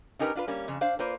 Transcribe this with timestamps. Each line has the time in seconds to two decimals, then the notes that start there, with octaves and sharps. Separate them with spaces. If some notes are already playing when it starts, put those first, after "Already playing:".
0.19 C#4 D#4 G4 A#4 B4
0.35 D4 F4 B4
0.47 G3 A#3 C#4
0.68 F2 C#3
0.81 D4 C5 F5
0.99 A#3 F4 B4 C5 D5